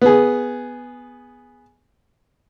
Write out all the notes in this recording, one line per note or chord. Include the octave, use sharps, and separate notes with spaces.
B3 G#4